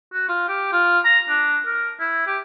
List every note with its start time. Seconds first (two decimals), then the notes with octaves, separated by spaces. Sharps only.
0.13 F#4
0.29 F4
0.48 G4
0.72 F4
1.05 A#5
1.29 D4
1.66 A#4
2.00 E4
2.27 G4